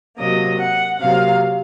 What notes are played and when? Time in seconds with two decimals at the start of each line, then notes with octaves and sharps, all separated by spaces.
0.17 C3 F#3 A#3 D#5
0.59 F#5
0.99 C3 F#3 A#3 F5